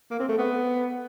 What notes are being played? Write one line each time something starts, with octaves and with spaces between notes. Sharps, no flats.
A#3
C4
A3
B3